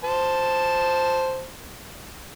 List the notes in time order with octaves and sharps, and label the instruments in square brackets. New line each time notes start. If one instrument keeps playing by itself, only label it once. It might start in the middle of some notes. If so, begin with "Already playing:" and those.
[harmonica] C5 A5